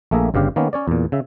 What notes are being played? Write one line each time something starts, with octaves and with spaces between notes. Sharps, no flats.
A#1 A3 A#3 G#4 E5 A#5
G1 G2 C#3 G4 F5
D#3 A#3 B3 C#4
C#4 C#5 D5
E2 A#2
C#3 E5